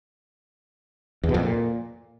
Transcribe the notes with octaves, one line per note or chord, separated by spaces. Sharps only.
E2
B2
F2
A#2